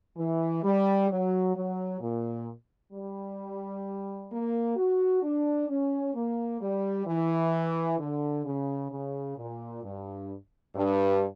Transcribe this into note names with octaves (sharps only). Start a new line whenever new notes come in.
E3
G3
F#3
F#3
A#2
G3
A#3
F#4
D4
C#4
A#3
G3
E3
D3
C#3
C#3
A#2
G2
G2